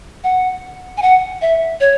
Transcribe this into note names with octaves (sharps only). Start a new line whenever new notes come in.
F#5
G#5
F#5
E5
C#5